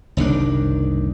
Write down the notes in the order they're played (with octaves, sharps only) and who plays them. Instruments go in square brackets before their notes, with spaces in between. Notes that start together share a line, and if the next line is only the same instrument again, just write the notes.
[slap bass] F#1 C2 D#3 D4